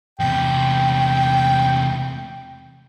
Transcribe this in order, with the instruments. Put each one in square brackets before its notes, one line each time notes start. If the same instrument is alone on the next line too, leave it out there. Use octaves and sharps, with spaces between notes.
[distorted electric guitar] E2 C3 [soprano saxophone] G5